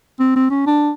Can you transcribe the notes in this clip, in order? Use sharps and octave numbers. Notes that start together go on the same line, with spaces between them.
C4
C4
C#4
D4